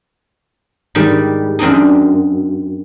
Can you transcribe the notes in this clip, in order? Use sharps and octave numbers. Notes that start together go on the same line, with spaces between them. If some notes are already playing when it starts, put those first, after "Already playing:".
G#2 D#3 G3
F#2 C4 D4 D#4